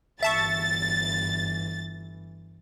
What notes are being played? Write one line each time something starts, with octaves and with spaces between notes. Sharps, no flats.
G1 E3 E5 A5 C#6 A6